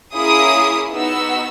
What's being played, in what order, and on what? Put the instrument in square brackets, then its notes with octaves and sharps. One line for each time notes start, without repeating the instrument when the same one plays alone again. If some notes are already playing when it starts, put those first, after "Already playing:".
[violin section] A#3 C#4 E4 G#4 D#6
B3 D#4 F#4 E6